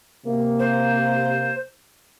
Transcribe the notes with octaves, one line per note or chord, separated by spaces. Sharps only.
C3 A#3
C5